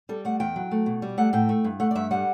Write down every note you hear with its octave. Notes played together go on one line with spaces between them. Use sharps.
G3 A4
A3 F#5
E2 G5
F#3
A3
B2
G3
A3 F#5
A2 G5
A3
G2
A3 F#5
D5
G2 E5
G3 F#5